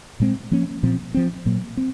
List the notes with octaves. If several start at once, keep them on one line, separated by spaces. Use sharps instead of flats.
A#2 G#3 C4
F3 A#3 C#4
A#2 F3 C4
F3 C4
A#2 F#3 A#3
C4